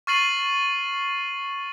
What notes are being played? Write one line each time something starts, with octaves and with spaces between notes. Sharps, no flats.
C#6 F6 A6 C7 D#7 F#7